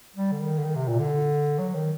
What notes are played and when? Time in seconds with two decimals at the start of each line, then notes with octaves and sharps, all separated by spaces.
0.16 G3
0.32 D3
0.40 D#3
0.58 D3
0.64 D#3
0.75 C3
0.88 A#2
0.99 D3
1.59 F#3
1.75 D#3